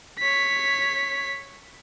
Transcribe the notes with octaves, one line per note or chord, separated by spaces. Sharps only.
C#5 B6